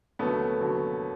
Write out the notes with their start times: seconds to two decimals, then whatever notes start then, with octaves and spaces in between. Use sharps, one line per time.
0.19 D#2 D3 F#3 A3 B3
0.60 D#2 D3 F#3